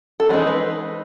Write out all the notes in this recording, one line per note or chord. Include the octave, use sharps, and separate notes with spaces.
A4
E3 G#3 C4 D#4 G#4
B4